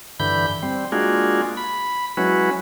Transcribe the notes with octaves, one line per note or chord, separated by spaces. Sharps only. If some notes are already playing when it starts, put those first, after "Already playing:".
G2 D3 E3 B5 G6
G3 C4
G#3 A#3 D4 F4 F#4 G#4
B5
F#3 G#3 C#4 E4 F#4 B4